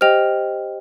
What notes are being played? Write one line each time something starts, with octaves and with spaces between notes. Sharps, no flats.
G4 C5 D#5 G5 F6 F7